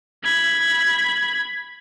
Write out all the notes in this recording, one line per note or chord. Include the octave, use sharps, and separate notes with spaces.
B5 G#6